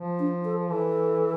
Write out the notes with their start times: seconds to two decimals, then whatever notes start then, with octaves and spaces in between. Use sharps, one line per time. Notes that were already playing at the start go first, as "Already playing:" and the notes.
Already playing: F3
0.19 D4
0.45 A4
0.71 E3 A4